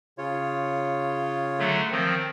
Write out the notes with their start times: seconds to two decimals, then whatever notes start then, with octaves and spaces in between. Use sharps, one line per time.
0.18 C#3 F4 C#5
1.59 D3 F#3 A3
1.91 D#3 F3 C4